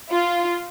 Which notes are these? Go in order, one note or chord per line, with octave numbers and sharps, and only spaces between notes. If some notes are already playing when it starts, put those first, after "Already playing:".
F4